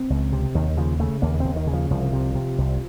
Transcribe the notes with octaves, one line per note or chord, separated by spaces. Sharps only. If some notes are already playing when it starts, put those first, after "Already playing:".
Already playing: C4
C#2
C3
D#2 D#3
C#3 F3
C#3 A3
D#2 A#3
D#2 C4
D#3
C#3
F3
C2 F3
C3
C3
C2